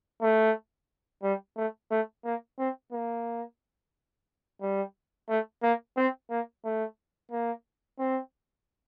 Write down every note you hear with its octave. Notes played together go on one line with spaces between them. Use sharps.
A3
G3
A3
A3
A#3
C4
A#3
G3
A3
A#3
C4
A#3
A3
A#3
C4